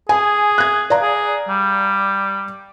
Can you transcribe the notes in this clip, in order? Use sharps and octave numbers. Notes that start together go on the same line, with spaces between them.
G#4 G#5
F#6 G#6
D5 F5 A#5
G#4
G3